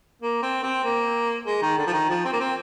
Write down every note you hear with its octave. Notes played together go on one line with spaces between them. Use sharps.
A#3
C4
C4
A#3
G#3
D#3
D3
F3
D#3
F3
C4
A#3
C4